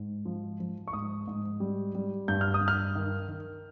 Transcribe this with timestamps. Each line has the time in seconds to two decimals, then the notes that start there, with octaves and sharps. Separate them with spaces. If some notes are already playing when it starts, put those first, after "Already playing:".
Already playing: G#2
0.25 F3
0.60 F3
0.88 C#6
0.93 G#2 D#6
1.27 G#2
1.60 G3
1.95 G3
2.28 G2 G6
2.41 F6
2.54 D#6
2.61 G2
2.68 F6
2.95 D#3
3.28 D#3